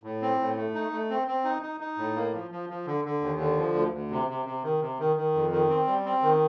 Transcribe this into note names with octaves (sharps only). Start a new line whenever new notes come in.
A2
C4
A2
A3
D#4
A3
C4
C4
D#4
D#4
D#4
A2
A#3
F3
F3
F3
D3
D3
D#2
D3
F3
D2
D2
C3
C3
C3
D#3
C3
D#3
D#3
F2
D#3
C4
G3
C4
D#3